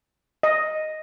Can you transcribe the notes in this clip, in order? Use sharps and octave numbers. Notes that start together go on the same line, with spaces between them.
D#5